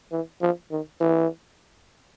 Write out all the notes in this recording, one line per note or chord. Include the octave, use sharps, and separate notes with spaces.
E3
F3
D#3
E3